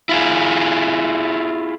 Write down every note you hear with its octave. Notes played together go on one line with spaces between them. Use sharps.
E4 F4 G#4